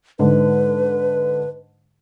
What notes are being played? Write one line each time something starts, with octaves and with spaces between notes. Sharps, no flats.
G#2 D3 B4